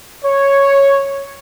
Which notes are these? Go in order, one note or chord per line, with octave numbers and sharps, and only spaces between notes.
C#5